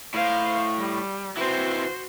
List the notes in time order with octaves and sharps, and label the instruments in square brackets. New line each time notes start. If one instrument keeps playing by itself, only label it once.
[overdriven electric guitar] A2 [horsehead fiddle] C5 F5
[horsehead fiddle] G3
[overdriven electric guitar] E3 C4 [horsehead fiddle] F#4 C5